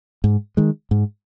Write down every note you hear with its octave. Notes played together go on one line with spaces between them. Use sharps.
G#2
D#3 G#3
G#2